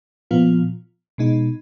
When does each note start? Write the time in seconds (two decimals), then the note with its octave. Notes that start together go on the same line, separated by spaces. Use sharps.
0.31 A#2 F3 B3 F4
1.18 B2 G#3 D#4